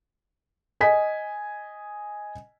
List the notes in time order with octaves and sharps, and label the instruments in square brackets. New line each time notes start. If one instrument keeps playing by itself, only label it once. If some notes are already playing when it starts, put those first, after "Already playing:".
[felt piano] D#5 G#5 B6